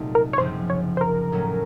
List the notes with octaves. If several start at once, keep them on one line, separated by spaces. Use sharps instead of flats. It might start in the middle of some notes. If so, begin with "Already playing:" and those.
Already playing: C2 A#2 F#3 A3 D#4
A#4
C#5
F#1 F#2 C#3 F3 C4 C5
C#5
C5
A#4
A2 F#3 A3 C#4